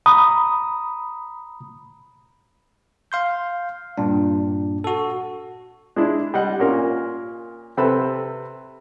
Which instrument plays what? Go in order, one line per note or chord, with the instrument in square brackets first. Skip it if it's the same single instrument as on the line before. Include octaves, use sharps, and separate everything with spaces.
[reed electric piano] A#5 B5 D#6
[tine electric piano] F5 C6 G6
G2 A#2 D4
F#4 A4
[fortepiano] G#3 D4 E4
G3 D#5 F#5
A#2 A#3 C#4 F4 A#4
C3 C4 A4 B4 B5